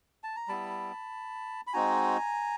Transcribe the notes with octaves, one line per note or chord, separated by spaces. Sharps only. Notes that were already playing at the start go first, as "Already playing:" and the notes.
A5
A#5
G3 B3 E4 A5 B5
B5
G#3 C4 D#4 F#4 G#5 A#5